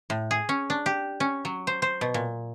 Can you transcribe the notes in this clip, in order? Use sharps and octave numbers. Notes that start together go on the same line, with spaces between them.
A2
G#4
C#4
D4
G4
C#4
F#3
C5
C5
B2
A#2